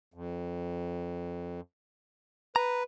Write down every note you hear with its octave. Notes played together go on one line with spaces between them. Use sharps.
F2
B4 A#5